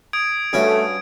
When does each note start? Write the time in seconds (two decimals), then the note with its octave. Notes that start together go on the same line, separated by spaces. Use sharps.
0.13 D#6 G#6 D7
0.53 G2 A3 C#4 F#4 D7